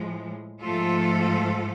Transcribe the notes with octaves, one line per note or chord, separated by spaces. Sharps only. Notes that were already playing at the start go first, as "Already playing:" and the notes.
Already playing: A2 F3 G#3
G#2 F3 A3 F4 A4